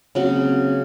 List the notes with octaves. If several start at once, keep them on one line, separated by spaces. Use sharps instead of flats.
C#3 F#3 A#3 C4 C#4